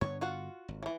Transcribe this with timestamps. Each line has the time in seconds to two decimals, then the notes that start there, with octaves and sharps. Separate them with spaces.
0.01 G2 D3 B3 C#5
0.21 F4 F#4 F#5
0.68 G#1
0.83 E3 F3